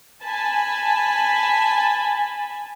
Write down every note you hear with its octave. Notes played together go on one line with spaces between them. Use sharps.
G#5 A5 B5